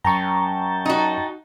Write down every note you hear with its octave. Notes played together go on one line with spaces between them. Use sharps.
F#2 G5 A5 A#5 C#6
D#4 F#4